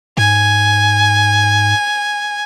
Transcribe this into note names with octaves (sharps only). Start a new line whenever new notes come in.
G#2 G#5